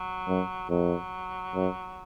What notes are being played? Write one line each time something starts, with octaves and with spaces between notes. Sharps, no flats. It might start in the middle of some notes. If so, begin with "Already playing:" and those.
Already playing: F#3
F#2
F2 F#3
F#2